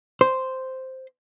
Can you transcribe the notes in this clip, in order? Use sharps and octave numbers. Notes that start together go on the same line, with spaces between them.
C5